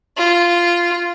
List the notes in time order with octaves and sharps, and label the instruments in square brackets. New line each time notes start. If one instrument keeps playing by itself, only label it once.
[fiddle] F4